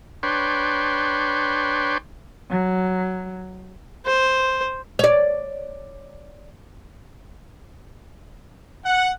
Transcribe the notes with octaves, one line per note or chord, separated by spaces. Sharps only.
D4 B4 C#5 G5 C6
F#3
C5
C#5 D5
F#5